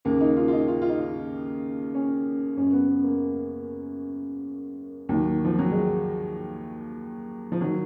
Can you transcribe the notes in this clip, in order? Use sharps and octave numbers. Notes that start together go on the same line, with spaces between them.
D#2 C#3 A#3
D#4
F4
F4
D#4
F4
F4
D#4
C#4
F#2 C#3 C#4
B3
B3
A#3
D#2 D#3 F#3
F3
F#3
G#3
F3
D#3 F#3